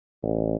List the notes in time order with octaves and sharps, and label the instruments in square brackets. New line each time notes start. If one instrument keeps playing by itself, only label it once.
[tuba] A1